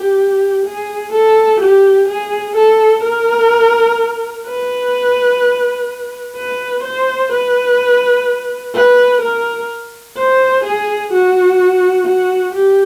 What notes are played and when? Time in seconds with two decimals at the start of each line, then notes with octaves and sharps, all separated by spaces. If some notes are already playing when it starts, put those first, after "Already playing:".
Already playing: G4
0.66 G#4
1.13 A4
1.60 G4
2.08 G#4
2.56 A4
3.03 A#4
4.46 B4
6.36 B4
6.83 C5
7.32 B4
8.75 B4
9.21 A#4
10.17 C5
10.64 G#4
11.12 F#4
12.06 F#4
12.54 G4